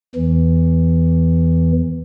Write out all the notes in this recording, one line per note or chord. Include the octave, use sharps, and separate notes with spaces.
E2 E3